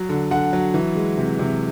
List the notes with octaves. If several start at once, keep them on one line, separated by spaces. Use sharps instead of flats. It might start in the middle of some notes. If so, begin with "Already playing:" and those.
Already playing: F#3
D3
D3 F#5
F#3
E3
G#3
C3
C3